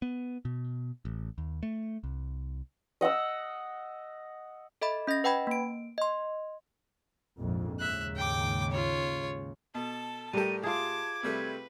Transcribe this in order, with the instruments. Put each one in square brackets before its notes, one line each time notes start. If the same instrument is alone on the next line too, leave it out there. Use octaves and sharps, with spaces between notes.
[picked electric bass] B3
B2
A1
D#2
A3
C2
[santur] D#5 F#5 D#6 E6
[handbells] A4 D#5 E5 B5
C#4 D#5 A6 A#6
B4 F#5 G5 B5 G#6
A#3 D7
D#5 C6
[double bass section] A#1 F2 G#2
[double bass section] D#2 G#2 C#3 [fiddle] E5 F#6
[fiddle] G5 D6
F4 C#5
[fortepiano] B2 [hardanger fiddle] A4 A5
[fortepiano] A2 G4 [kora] G3 A4 [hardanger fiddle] A#4 [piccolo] D#7
[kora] F4 G#4 [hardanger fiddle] A5 D6 [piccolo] G#6
[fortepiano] C3 G3 A3 [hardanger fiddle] B4